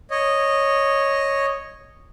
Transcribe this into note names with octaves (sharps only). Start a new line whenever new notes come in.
C#5 D#5